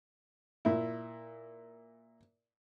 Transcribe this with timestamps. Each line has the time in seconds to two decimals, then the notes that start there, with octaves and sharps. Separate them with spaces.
0.65 A#2 E4